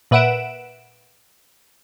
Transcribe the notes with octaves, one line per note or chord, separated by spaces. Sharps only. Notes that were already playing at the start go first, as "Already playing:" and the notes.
A#2 B4 E5 F#5 D7 E7